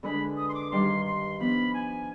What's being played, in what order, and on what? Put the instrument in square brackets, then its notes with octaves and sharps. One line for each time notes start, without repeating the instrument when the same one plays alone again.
[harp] D3 G#3 D4 G#4 B4 [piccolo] B5
[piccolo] D#6
C6
D6
[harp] G2 D#3 G3 [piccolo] C6
[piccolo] C6
[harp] F3 B3 D4 [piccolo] B5
[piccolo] G#5